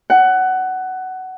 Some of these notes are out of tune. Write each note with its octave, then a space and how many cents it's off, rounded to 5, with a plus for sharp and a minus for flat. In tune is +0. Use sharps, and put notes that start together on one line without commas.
F#5 +15